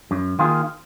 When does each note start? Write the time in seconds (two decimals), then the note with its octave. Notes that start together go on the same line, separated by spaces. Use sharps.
0.11 F#2
0.39 D#3 A#3 F4 G#4